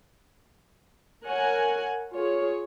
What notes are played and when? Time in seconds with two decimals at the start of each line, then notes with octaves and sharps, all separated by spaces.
1.25 A#4 C#5 F#5 G#5
2.15 F4 G#4 C#5